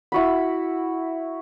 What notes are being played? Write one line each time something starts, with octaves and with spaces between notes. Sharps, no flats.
E4 F#4 B5